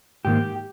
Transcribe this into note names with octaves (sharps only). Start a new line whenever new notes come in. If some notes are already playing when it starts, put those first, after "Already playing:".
G#2 D#3 A#3 G4